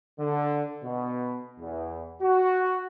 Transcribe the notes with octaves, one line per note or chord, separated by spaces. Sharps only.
D3
B2
E2
F#4